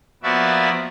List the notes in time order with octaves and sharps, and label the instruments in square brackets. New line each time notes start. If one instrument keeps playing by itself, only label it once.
[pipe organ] F3 A#3 B3 F#4 D5 E5